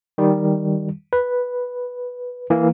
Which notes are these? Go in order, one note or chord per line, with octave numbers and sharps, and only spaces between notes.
D#3 G3
B4
E3 A#3